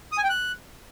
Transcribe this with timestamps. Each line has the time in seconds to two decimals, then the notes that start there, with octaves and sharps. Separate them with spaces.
0.12 D#6
0.18 G#5
0.24 G5
0.29 F#6